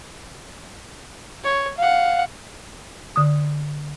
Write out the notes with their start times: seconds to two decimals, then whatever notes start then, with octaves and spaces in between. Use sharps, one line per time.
1.44 C#5
1.78 F5 F#5
3.16 D3 D#6